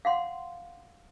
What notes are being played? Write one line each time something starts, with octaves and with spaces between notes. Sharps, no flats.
F5 F#5 C6